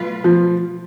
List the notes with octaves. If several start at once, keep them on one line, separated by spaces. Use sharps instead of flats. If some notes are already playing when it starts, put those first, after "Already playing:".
Already playing: B2 F#3 A3 F4 B4
F3